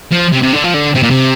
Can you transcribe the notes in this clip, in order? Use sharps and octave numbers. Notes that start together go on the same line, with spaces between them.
F3
C3
C3
D3
F3
D3
C3
A#2
C3